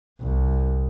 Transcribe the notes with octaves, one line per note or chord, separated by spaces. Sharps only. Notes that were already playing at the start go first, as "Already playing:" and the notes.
C2